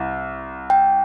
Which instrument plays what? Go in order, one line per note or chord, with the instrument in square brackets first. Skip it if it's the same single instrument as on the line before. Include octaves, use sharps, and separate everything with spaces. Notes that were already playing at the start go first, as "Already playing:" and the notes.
Already playing: [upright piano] C2
[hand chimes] G5